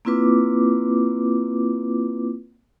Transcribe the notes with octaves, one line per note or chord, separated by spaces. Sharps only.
A#3 C4 E4 F4 B4 D6